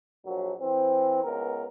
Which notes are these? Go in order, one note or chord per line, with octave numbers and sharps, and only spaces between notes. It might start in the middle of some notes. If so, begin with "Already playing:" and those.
A#1 F#3
E3 C4
C#2 B3 A#4